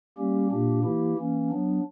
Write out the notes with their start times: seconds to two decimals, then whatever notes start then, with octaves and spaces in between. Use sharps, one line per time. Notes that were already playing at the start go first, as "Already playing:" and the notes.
0.18 G3 A#3 C#4 G4
0.51 A#2 A#3 D4 G4
0.84 E3 A#3 E4 G4
1.18 E3 A#3 C#4
1.51 F#3 B3 D4